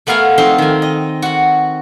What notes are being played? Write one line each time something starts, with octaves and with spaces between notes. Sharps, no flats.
A3 B3 A#4 F5 G#5 A#5
F2 C4 D#4 C5
D#3 G#5
D#5
F#4 F#5